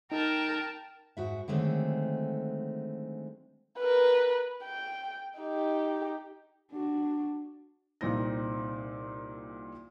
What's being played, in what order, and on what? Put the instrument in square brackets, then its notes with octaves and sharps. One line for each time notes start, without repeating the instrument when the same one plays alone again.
[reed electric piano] D#4 [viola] A#4 [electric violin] G5 A5
[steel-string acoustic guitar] G#2 F#4 E5
D3 D#3 F#3 G#3 A3 C4
[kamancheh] A#4 B4
G5
D#4 G4
[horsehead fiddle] D4 F#4
[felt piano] C2 A#2 C4 D#4 A#6